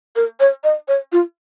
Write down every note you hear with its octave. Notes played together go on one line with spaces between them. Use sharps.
A#4
C#5
D#5
C#5
F4